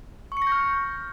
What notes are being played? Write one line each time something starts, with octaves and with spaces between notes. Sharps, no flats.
C#6
C#7
A#6
G6
F6